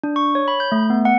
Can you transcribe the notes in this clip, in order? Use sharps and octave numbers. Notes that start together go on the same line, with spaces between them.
D4
C#6
C#5
B5
G6
A3
B3
F#5